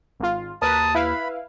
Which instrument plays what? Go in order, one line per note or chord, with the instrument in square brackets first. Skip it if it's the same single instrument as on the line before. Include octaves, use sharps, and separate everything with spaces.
[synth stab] G#1 F4
[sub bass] D#2 [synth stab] A#4 B4 [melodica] A5 D#6
[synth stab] E4 B4 F5 [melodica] B5